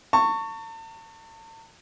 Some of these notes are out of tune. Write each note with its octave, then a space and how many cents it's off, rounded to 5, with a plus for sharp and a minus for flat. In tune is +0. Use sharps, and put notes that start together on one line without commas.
A5 +40 C#6 +0